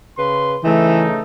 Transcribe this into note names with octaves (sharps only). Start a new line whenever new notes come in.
C#3 B4 C6
C#3 E3 A3 D#4